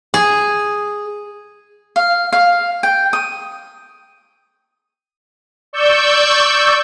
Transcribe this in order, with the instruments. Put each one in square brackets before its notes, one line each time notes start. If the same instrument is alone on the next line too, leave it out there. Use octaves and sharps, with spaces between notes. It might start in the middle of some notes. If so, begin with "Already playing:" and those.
[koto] G#4
[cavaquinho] F5
F5
G5
D#6
[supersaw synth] D5 C#6 E6 G6